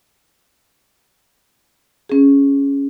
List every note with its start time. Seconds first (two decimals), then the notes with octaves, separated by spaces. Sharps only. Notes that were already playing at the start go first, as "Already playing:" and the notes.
2.09 C#4 G#4